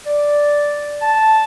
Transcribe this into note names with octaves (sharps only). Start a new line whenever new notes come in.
D5
A5